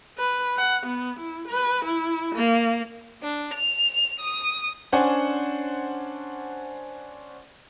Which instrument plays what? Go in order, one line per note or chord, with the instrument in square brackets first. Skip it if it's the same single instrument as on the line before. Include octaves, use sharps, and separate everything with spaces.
[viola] B4
F#5
B3
E4
B4
E4
A#3
[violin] D4
F7
D#6
[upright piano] C#4 D4 C5 F#5 G#5